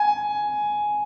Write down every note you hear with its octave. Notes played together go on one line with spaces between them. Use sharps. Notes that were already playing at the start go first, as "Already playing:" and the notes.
Already playing: G#5